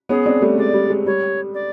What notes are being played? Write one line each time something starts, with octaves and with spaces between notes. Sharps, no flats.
B3 C#4 G#4
C4 D4
G3 A3
G#3 D5
G3
G#3
G3 C#5
D5